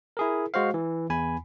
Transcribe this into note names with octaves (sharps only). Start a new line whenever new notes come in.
E4 G#4 A#4
G#3 F#4 C5 F5
E3
E2 G#5 B5